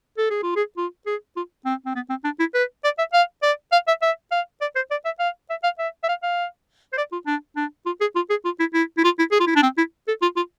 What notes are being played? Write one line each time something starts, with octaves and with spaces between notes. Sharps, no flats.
A4
G#4
F4
G#4
F4
G#4
F4
C4
C4
B3
C4
D4
E4
B4
D5
E5
F5
D5
F5
E5
E5
F5
D5
C5
D5
E5
F5
E5
F5
E5
E5
F5
F5
C5
D5
F4
D4
D4
F4
G#4
F4
G#4
F4
E4
E4
E4
F4
E4
G#4
F4
E4
D4
C4
E4
A4
F4
F4